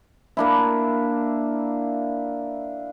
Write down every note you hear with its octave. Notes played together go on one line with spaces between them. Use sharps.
A#3 D4 E4